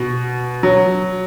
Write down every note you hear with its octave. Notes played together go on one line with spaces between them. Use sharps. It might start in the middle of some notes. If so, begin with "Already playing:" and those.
Already playing: B2
F#3